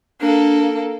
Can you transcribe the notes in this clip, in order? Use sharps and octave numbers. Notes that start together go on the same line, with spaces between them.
A#3 D4 A4